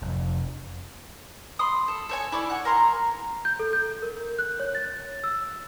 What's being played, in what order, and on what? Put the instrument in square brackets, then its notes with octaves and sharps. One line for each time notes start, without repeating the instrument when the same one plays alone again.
[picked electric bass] F1
[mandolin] B5 C6 D#6
A4
A4 C#5 G#5
E4 D5 C#6
F#5 G#5
A#4 A#5 C6
[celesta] G6
A4
G6
A#4
F#6
C#5
A6
E6